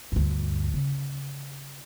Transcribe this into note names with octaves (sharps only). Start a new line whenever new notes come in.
D2 G2
C#3